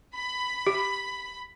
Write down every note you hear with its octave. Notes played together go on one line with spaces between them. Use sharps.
B5
G4